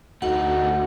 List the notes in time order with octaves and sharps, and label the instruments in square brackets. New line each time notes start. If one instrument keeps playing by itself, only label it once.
[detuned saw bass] D2 [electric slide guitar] A3 D#4 [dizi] F#4 [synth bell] F#5